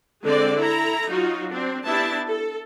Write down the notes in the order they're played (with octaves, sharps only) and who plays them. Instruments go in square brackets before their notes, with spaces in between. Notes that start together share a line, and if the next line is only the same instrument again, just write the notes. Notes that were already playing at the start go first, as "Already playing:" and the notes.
[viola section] D3 G#3 C4 D5
E4 A4 A#5
F#3 D#4 F4 F#4
C4 D4
B3 D4 E4 G4 E5 A5
A4